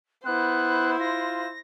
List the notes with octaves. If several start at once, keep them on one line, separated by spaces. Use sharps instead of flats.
B3 E4 C5 F#6
F4 A#6